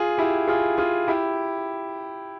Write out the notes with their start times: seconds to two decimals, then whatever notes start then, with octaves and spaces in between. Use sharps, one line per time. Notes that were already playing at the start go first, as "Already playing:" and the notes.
Already playing: F4 G#4
0.18 E4 G4
0.48 F4 G#4
0.78 F4 G#4
1.08 E4 G4